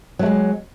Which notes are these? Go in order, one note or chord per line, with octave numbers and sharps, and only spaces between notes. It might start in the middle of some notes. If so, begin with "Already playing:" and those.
F#3 G#3 A3